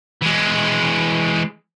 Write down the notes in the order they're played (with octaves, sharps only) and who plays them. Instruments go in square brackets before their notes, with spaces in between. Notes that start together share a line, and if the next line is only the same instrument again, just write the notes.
[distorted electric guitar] E3 G#3